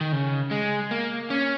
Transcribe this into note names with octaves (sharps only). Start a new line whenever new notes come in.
D#3
C#3
G#3
A#3
C#4